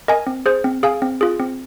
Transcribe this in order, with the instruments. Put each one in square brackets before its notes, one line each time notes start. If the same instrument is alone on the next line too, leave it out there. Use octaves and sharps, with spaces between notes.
[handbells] A#4 D#5 G#5
C4
G#4 C5
C4
G#4 F5 G#5
C4
F4 G#4
C4